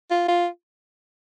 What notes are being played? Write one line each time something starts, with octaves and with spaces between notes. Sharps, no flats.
F4
F4